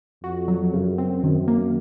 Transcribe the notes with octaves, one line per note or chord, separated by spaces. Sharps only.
F2 F#4
F#3
F#2 C#3
C4
F#2 D#3
A#3